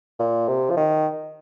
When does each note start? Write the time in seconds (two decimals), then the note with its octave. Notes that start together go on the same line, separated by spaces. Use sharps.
0.19 A#2
0.48 C3
0.70 F3
0.77 D#3